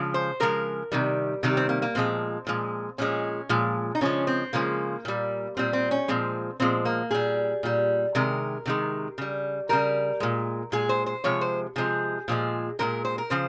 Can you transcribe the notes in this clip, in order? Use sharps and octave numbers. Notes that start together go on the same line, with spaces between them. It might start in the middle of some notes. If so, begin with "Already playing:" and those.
Already playing: C#3 F3 G#3
C5
C#3 F3 G#3 A#4
C3 D#3 G3
C3 D#3 G3 G4
C4
A#3
A#3
A#2 F3 G#3 C4
A#2 F3 G#3
A#2 F3 G#3 C#4
A#2 F3 G#3
D#4
C#3 F3 G#3 C#4
C4
C#3 F3 G#3 A#3
A#2 G3
A#2 G3 C4
C4
C#4
A#2 F3 G#3 C4
A#2 F3 G#3 C4
A#3
A#2 G3 G#4
A#2 G3
C3 D#3 G#3 A#4
C3 D#3 G#3
C#3 G3
C#3 G3 A#4
A#2 G#3
A#2 G#3 G#4
C5
C5
C3 F3 G#3 C#5
C5
C3 F3 G#3 G#4
A#2 F3 G#3
A#2 F3 G#3 A#4
C5
A#4
C#3 F3 C5